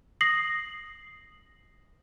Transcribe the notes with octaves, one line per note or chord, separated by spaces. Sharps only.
D#6 A#6 C7 F#7